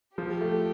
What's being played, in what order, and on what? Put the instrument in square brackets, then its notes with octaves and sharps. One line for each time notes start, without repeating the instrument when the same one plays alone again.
[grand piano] F3 [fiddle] G4
[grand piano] A3